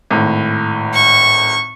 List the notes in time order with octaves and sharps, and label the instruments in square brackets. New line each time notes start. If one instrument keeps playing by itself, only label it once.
[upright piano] G#1 A2
[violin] C#6